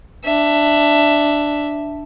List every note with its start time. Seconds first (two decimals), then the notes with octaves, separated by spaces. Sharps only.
0.24 D4 E5